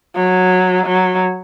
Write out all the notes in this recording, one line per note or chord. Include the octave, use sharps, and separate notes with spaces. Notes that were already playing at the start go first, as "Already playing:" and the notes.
F#3
F#3